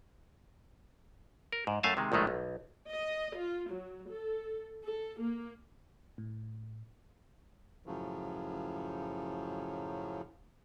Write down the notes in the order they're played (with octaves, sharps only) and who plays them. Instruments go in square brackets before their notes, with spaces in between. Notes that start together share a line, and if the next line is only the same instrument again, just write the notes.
[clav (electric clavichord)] A#4
G#2
F#2 A3 F5 G#5 A5
C3 D#3 G#3
A#1 A2 D#3 G#3 A3
B1
[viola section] D#5
F4
F#3
A4
A4
A#3
[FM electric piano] A2
[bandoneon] F#2 A2 C#3 F3 F#3